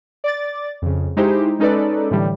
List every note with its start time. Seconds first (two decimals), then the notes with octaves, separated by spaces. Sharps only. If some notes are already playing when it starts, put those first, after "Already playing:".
0.24 D5 D6 A6
0.82 F2 C#3
1.16 G#3 D#4 E4 G4 C5
1.59 G#3 C#4 D#4 A4 B4 D5
2.11 A2 D3 E3 G3